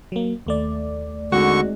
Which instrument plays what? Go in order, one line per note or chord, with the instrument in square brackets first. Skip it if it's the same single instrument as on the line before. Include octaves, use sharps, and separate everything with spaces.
[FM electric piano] F#3 A#3
D#2 A3 D5
[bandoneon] D3 C#6 [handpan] G#3 C4 D#4 [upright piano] F#4